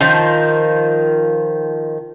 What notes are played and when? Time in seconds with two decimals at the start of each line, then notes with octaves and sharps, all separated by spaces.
0.01 D#3 F3